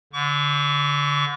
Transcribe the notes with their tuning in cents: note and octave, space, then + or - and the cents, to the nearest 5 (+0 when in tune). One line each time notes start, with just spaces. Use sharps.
D3 -25 C#6 +45